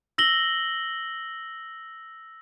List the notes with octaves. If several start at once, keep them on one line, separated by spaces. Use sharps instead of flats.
E6 A#6 F#7 G7